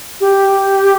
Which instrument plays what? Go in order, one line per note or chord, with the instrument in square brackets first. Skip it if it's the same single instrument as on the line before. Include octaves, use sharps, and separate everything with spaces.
[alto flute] G4